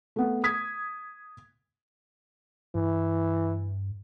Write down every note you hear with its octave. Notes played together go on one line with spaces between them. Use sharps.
A3 B3
D#6 G#6 B6
G2 E3